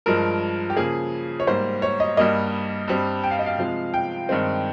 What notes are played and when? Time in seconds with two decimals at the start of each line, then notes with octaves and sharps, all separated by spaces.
0.06 G2 F3 G#3 A#4
0.70 G4
0.76 C#3 F3 A#3 G#4
1.40 C#5
1.47 G#2 G3 A#3 C5
1.82 C#5
2.00 D#5
2.17 G2 G3 A#3 D#5
2.88 G2 G3 C4
3.23 G5
3.31 F5
3.39 D#5
3.46 F5
3.58 C3 F3 G#3
3.94 G5
4.29 G2 D#3 G#3 C4